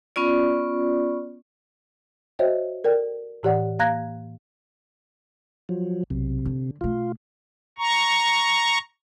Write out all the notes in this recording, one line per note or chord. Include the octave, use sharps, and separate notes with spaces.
B3 C#4 F4 D5
F#4 C5 C#5 D#5 E5 G5
A4 A#4 D5 G5
A2 E3 G4 C#5 D5 F#5
A#3 F5 A#5 F#6 G#6 A#6
F3 F#3
B1 C3
D3
B2 A3 F4
A#5 C#6